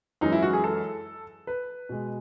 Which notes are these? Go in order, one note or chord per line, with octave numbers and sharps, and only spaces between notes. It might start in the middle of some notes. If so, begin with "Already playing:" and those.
F#2 E3 G#3 D#4
E4
F#4
G#4
A4
B4
B2 G#3